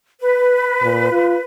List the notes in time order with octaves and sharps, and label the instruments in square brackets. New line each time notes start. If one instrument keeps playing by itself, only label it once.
[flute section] B4
[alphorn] A#2
F4